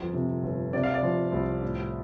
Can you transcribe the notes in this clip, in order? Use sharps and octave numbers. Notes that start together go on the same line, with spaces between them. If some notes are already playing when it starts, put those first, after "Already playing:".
Already playing: G1 F2
C3
G1
C3 D5
F5
D5
F3
C2
A2